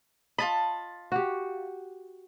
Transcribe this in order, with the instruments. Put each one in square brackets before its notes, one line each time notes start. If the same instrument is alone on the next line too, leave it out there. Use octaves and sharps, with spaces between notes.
[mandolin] F4 A5 B5 [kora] D#5
[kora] F#4 G4